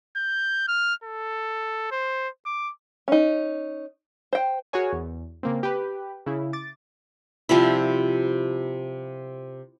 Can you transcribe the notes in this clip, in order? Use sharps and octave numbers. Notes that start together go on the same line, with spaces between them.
G6
F6
A4
C5
D6
C#4 D#4
C5 G5
F#4 G#4 A#4 C#5 G#5
E2
C#3 A#3 C4
G4 B4
C#3 E4
D6 A6
C3 F3 G3 E4